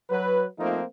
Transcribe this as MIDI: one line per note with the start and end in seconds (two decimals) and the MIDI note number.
0.10 0.47 54
0.10 0.47 71
0.59 0.82 53
0.59 0.82 57
0.59 0.82 58
0.59 0.82 60
0.59 0.82 63
0.59 0.82 65